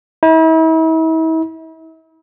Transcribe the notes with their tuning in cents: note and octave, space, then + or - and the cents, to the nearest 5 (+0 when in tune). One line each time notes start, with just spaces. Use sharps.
E4 -40